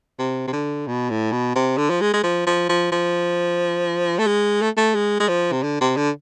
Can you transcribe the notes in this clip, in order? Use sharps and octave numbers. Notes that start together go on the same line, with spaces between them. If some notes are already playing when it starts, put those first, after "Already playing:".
C3
C3
D3
B2
A2
B2
C3
D3
F3
G#3
G#3
F3
F3
F3
F3
A3
G#3
A3
A3
G#3
G#3
F3
C3
D3
C3
D3